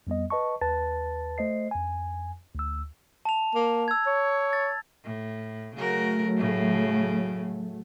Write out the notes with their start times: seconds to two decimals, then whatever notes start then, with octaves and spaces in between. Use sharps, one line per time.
0.07 F2 G3 B3 D#5
0.30 B4 D#5 A5 C#6
0.61 D#2 B4 A5 A6
1.38 A3 C5 D#5 C7
1.71 F2 G#5
2.55 D2 E6
3.25 A5 F7
3.55 A#3
3.88 E6 G#6
4.06 C#5
4.53 A6
5.03 A2
5.75 C#3 F#3 A3 F#4 A#4
6.37 A2 C#3